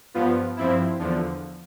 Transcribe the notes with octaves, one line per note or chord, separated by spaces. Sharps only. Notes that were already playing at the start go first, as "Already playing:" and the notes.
G2 F3 B3 F4
G2 F3 C4 E4
E2 D3 F3